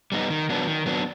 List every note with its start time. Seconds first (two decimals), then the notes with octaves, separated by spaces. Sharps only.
0.12 G3 B3 D#4
0.30 D#3
0.49 F#3 B3 D4
0.67 D#3
0.86 F#3 B3 D4